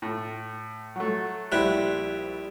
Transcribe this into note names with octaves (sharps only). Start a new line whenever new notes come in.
A2
F#3 A3
A#1 G3 E4 C5 F#6